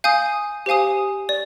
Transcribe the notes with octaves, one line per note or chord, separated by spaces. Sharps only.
F5 G#5 D#6 G6
G4 C5 F5 G#5 D#6
D5